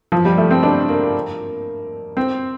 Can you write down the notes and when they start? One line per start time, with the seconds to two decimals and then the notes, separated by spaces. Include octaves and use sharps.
0.12 F3
0.25 G3
0.37 A3
0.51 C4
0.63 D4
0.89 A#3
2.17 C4